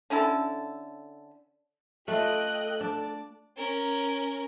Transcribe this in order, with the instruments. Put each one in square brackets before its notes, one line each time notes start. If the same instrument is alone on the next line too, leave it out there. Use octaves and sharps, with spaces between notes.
[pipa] D3 C#4 E4 A4
[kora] A3 F4 [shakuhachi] A4 [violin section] D#5 G5 F#6
[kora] D4 [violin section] D5
[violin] C#4 A#4